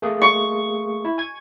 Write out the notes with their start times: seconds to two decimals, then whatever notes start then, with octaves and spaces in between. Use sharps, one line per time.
0.02 A3 A#3 G#4
0.22 C#6
1.05 E4
1.18 G#5 G#6